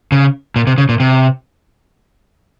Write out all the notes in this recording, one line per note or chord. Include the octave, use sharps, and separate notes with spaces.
C#3
A#2
C3
C#3
A#2
C3